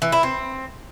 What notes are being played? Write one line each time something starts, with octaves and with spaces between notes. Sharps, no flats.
E3
E4
C4